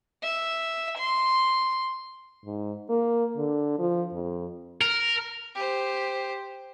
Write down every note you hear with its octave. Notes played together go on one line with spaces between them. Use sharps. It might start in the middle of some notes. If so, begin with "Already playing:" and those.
E5
C6
G#2
A#3
D3
F3
F2
A#4
G4 C5